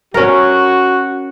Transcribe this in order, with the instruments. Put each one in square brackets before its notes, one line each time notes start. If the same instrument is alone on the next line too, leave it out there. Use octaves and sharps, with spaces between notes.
[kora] C#4 A#4 [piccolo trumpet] F#4